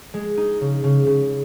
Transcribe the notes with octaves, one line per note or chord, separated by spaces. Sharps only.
G#3
D#4
C#3
C#3
C#3